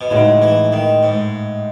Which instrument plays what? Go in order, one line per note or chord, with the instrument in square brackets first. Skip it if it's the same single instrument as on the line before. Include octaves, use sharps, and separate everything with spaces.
[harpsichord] B2
[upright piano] A2 G#3 D#4 F#4 [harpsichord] C#3
[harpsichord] E3
D#3
G#2